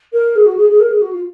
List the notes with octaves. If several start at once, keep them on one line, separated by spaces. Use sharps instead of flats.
A#4
G#4
F#4
G#4
G#4
A#4
G#4
F#4
F4